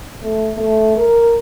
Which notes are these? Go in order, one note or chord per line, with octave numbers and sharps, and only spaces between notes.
A3
A3
A#4